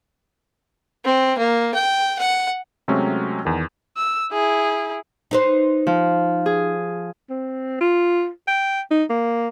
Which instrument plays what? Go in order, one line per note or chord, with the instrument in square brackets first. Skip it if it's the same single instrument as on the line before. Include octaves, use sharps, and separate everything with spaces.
[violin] C4
A#3
G5
F#5
[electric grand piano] C3 F#3 G#3 A3 C4 C#4
E2 D#3
[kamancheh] E6
E4 G#4
[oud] D#4 B4 C5
[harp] F3
G#4
[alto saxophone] C4
F4
G5
D#4
A#3